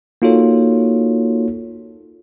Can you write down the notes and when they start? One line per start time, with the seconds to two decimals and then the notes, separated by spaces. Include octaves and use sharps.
0.22 A#3 D#4 F4 F#4 A4 C#5